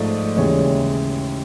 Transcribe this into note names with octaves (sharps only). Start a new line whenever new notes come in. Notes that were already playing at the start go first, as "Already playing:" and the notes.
Already playing: G#2 F3 A3 D5
D#2 C#3 E3 G#3 C#5